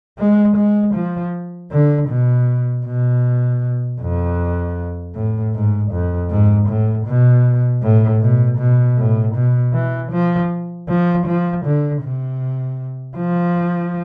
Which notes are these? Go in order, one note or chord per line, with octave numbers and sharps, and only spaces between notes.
G#3
G#3
F3
D3
B2
B2
F2
A2
G#2
F2
G#2
A2
B2
A2
B2
B2
A2
B2
E3
F3
F3
F3
D3
C3
F3